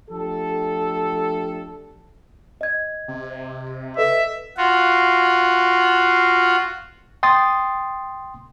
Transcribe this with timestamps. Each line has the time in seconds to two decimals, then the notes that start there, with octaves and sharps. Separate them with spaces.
0.10 F3 A3 D4 G4 A4
2.61 D#5 G#6
3.08 C3
3.97 A4 B4 D#5 E5
4.57 F4 F#4
7.23 G5 C6 D#6 A6